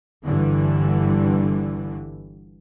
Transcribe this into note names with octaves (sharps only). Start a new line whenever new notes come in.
G1 G2 D3 E3